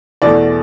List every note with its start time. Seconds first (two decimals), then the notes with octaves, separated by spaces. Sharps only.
0.22 E2 B2 A3 D5